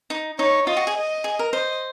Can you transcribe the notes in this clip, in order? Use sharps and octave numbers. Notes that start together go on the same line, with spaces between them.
D#4
D#4 C#5
F4 D#5
F#4
G#4
D#5
G#4
A#4
C5 D#5